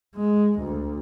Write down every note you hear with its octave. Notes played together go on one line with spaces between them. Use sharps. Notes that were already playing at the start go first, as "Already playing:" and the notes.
G#3
D2